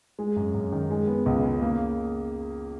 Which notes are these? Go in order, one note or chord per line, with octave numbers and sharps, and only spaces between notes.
G#3
F#2
F#2
D#3
G#3
B3
C#2
C#3
A#3